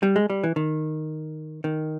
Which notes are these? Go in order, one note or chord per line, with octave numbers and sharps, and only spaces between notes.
G3
G#3
G3
E3
D#3
D#3